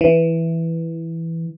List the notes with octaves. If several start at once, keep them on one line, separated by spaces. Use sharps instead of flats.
E3